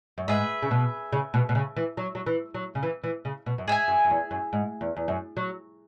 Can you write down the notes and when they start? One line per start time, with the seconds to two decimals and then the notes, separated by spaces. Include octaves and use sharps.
0.18 F#2
0.28 G#2 G#4 B4 E5
0.62 C#3
0.71 B2
1.12 C#3
1.34 B2
1.49 B2
1.55 C#3
1.76 E3
1.97 F#3
2.15 F#3
2.26 E3
2.54 F#3
2.75 C#3
2.83 E3
3.04 E3
3.25 C#3
3.46 B2
3.58 F#2
3.68 G#2 G#4 E5 G#5
3.88 F#2
4.05 F#2
4.10 E2
4.31 F#2
4.53 G#2
4.81 E2
4.96 E2
5.08 F#2
5.37 F#3